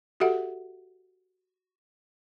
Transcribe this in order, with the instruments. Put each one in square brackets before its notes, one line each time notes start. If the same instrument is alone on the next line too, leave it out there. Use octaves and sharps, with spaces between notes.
[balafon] F#4 G4 A4 E5 F#5